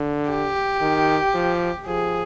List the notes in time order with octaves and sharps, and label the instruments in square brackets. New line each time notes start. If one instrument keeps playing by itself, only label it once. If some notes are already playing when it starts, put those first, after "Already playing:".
Already playing: [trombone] D3
[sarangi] G4
[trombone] D#3
F3
[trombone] F3 [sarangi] G#4